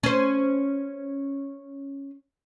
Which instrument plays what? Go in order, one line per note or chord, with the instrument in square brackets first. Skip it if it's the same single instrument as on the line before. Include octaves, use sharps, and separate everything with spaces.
[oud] C#4 C5